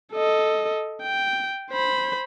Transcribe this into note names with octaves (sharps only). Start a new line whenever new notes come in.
A4 D#5
G5
C5 B5